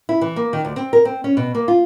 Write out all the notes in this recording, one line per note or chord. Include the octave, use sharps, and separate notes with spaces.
E4
E3
A#3
D#3
D2
C4
A#4
C4
C#4
B2
A#3
F4